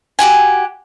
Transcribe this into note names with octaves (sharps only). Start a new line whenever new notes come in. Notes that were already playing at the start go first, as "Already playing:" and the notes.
F#4 G4 F#5 G#5